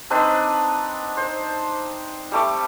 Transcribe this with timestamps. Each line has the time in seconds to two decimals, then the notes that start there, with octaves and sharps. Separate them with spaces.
0.10 C4 D4 D#4 B4
1.17 C5
2.32 G3 A3 D6